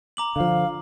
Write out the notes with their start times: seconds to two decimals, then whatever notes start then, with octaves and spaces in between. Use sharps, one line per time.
0.17 A#5 D6 F#7
0.36 D3 F3 F5